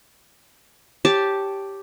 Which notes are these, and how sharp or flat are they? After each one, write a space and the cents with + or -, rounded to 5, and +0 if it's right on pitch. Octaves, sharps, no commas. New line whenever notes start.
G4 +0 C#5 +0 A5 -5